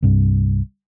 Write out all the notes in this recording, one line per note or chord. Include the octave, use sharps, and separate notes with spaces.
C2 G2